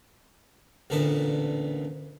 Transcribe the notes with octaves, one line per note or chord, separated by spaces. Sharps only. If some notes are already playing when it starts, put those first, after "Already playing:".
A1 D2 A#2 D3 B3 A5